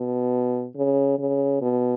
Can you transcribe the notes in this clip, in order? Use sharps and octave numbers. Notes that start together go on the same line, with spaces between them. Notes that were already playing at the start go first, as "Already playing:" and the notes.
Already playing: B2
C#3
C#3
B2